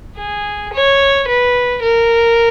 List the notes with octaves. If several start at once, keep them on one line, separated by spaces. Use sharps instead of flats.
G#4
C#5
B4
A#4